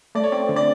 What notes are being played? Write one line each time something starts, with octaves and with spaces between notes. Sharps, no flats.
A3 D5
C#5
C4 D5
D3
D5